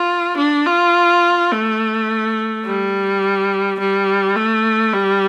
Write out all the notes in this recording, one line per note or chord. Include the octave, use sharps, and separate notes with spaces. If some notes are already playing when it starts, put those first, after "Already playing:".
Already playing: F4
D4
F4
A3
G3
G3
A3
G3